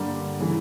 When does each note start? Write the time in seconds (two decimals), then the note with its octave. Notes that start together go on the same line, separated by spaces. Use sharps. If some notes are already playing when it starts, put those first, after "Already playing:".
Already playing: G2 D3 G3 A#3
0.40 C#3 E3 A3